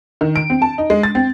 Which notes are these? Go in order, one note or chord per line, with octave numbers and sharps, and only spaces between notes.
D#3
D7
C4
A5
D#4
G#3
A6
C4